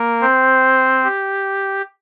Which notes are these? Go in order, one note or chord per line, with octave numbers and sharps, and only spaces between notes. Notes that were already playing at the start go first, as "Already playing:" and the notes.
Already playing: A#3 A#4
C4 C5
G4